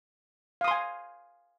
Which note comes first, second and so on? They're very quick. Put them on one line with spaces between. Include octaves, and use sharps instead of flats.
F5 D#6 C6 G#5